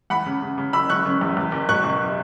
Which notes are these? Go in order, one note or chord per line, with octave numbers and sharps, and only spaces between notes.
E2 F#5 B5
C#3
C#3
C#3
F#1 B5 E6
F#1 C#6 F#6
C#3
E2
E2
F#1
B2 C#6 F#6
F#1